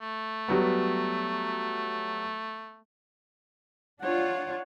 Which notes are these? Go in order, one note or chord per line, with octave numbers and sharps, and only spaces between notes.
A3
F#3 G3 B3
D4 F4 C#5 F#5